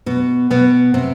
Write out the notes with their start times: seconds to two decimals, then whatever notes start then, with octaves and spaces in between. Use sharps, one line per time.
0.06 B2 B3
0.50 B2 B3
0.94 C3 C4